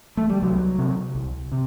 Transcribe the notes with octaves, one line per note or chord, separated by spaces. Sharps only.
A3
G3
C2 F#3
C3
C2
C3